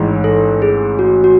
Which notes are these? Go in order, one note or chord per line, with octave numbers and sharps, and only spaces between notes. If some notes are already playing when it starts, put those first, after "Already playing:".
Already playing: A1 G#2 E3
A4
G#4
F#4
F#4